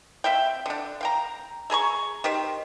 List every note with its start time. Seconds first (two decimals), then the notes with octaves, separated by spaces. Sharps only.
0.24 C4 E5 F5 G5
0.66 D3 D4
1.01 F5 G5 A#5
1.70 A3 G#4 A#5 C#6
2.24 D#3 G4 C5